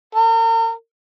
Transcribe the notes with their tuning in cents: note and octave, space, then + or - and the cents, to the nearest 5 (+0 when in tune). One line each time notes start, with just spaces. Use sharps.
A#4 -40